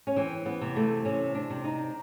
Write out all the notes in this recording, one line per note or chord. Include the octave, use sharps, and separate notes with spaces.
C#4
E3 C4
B3
C3
A3
C3 C#4
D4
C3
D#4